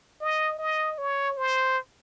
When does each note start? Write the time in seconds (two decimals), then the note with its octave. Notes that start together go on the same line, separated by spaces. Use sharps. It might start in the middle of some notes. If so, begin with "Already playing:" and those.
0.21 D#5
0.59 D#5
0.98 C#5
1.37 C5